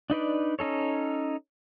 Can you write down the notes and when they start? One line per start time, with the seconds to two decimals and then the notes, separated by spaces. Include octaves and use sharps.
0.10 D4 D#4 B4 D5
0.59 C#4 D#4 A4 C#5